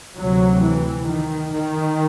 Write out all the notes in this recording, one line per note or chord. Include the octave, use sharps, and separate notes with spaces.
D2 C3 F#3
E3
D#3
D#3